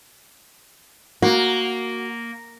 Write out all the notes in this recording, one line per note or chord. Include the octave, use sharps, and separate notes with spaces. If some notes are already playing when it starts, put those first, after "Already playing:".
A#3 F#4